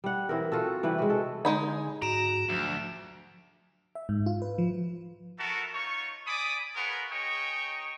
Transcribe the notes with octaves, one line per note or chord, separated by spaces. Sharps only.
G3 F#5
E3 C4 A#4
F4 F#4 A4
C3 E3 G3 B4
G#3 F#4
A4
D3 G#3 D#4 G#5 B5
G#2 F#4 A#5 D7 E7 F7
D2 F3 F#3
E5
G#2
F4
B4
F3
B3 F#4 A4 A#4 E5 A5
D#4 F4 C#5 C#6
D5 G#5 B5 D6 D#6
F4 G#4 A#4 B4 C#5 F#5
D#4 G#4 C#5 D#5 G5 C#6